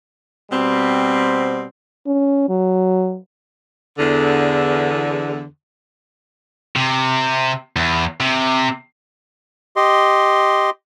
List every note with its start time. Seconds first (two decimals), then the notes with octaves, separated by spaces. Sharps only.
0.51 B2 G3 C4
2.06 C#4
2.49 F#3
3.99 E2 D3
6.76 C3
7.76 E2
8.20 C3
9.76 G4 D#5 C6